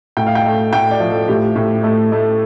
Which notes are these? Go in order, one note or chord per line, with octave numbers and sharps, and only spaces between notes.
A2 G5
F5
G5
A3
A2 G5
D5
F3
A4
A2 G4
A2
A3
A3